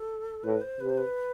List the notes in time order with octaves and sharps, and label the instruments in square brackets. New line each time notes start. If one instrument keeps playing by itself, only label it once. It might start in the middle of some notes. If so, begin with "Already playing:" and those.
Already playing: [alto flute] A4
[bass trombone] A2 [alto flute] B4
[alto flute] C5
[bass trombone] C3 [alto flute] B4
[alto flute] C5
B4